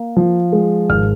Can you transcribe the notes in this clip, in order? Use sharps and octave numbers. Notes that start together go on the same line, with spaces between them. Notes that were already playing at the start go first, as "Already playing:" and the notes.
Already playing: A#3
F3
G#3
G#1 F6